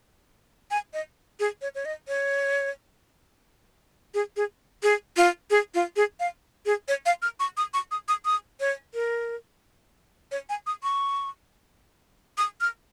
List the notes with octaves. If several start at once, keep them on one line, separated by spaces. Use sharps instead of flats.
G#5
D#5
G#4
C#5
C#5
D#5
C#5
G#4
G#4
G#4
F4
G#4
F4
G#4
F5
G#4
C#5
F5
F6
C#6
D#6
C#6
D#6
D#6
D#6
C#5
A#4
C#5
G#5
D#6
C#6
D#6
F6